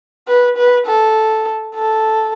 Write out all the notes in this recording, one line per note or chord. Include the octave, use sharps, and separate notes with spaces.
B4
B4
A4
A4